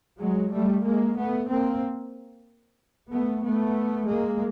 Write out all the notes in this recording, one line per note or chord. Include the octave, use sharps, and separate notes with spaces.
F#3 G#3
G3 A3
G#3 A#3
A3 B3
A#3 C4
A3 B3
A3 B3
G#3 A#3